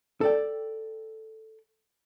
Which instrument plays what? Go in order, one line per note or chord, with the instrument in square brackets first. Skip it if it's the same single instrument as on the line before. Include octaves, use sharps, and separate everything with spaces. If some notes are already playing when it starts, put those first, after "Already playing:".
[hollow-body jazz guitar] A4 D5 G5